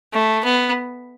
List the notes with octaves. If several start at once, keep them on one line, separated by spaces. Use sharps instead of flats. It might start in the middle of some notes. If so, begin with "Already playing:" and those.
A3
B3